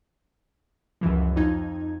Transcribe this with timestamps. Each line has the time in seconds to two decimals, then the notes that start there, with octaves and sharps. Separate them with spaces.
1.01 C#2 F#2 E3 F3
1.36 F2 D#4 G#6